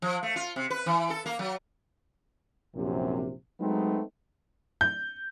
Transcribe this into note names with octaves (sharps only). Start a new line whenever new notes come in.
F3
A3
F4
C3
B4
E3
A4
A#3
F#3
A#1 F#2 C3
F#3 G#3 A3 B3 C4 D#4
G6